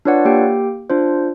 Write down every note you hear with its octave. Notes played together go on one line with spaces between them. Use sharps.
D4 F4 B4 C#5 D5 F#5
A#3 G4 G5
D4 F4 C5